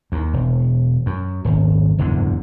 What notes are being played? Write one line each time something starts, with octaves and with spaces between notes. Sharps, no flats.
D#2
E1
F#2
D#1 G#1
F#1 E2 G#2 D3